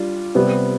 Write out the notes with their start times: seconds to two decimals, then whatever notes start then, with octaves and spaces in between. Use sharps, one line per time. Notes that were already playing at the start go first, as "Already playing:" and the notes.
Already playing: G3 D4 F4
0.35 C3 G3 B3